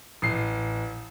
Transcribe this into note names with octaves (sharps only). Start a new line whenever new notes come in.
A1 C7